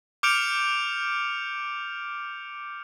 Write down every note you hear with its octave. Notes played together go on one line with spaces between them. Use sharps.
D6 F6 G6 C#7 D7 F7